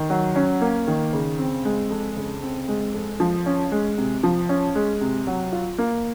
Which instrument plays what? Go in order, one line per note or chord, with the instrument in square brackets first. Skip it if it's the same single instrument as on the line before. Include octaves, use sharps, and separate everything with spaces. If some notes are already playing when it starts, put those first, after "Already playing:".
Already playing: [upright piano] D#3
F#3
C#4
A#3
D#3
C#3
C4
G#3
F2
C#3
C4
G#3
F2
F3
C#4
G#3
C3
F3
C#4
G#3
C3
F#3
F4
A#3